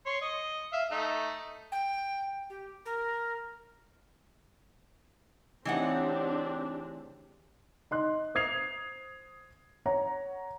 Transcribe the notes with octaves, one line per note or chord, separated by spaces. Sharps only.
C#5 C6
D#5
E5 F5
A3 D#4
G5
G4
A#4
C#3 E3 A3 C4 D4 D#4 G4 F#5
D#4 C6 F#6
C5 D#6 G#6 C7 F7
C#5 F#5 A#5